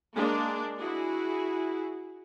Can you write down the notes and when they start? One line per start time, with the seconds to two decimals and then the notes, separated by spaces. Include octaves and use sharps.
0.15 G#3 A#3 D4
0.77 E4 F#4 G#4